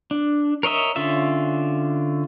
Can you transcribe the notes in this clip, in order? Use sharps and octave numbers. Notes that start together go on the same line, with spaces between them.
D4
A#4 C#5 D#5 E5
D3 C#4 F4 E5